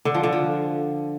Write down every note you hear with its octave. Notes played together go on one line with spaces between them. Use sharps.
D3
F3
D3
F3